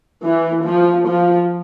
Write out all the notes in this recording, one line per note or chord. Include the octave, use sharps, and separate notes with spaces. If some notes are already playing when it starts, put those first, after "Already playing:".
E3
F3
F3